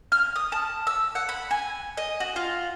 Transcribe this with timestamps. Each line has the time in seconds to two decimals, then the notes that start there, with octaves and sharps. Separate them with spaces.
0.12 F6
0.36 D#6
0.52 A5
0.87 E6
1.15 F#5
1.29 B5
1.51 G#5
1.97 D#5
2.20 F#4
2.36 F4